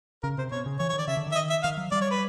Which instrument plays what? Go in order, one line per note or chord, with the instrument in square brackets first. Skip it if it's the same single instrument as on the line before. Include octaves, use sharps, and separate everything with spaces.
[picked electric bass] C#3 [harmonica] A#4
[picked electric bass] C3 [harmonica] C5
[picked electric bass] B2 [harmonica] C#5
[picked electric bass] C#3
[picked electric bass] E3 [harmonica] C#5
[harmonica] C#5
[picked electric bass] D#3
[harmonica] D5
[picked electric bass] C#3 [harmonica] E5
[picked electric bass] D3
D#3
[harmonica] E5
D#5
E5
[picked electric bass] D#3 [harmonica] F5
[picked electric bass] F#3
[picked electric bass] G3 [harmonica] D5
[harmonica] C#5
B4